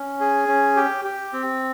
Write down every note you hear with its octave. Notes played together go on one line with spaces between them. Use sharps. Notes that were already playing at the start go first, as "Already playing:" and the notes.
Already playing: C#4
G#4
C#4
G4
G4
C4